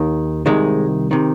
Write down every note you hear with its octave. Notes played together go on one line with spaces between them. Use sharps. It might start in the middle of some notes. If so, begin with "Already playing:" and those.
Already playing: D#2 D#3
C2 C3 D#3 G#3
C3 D#3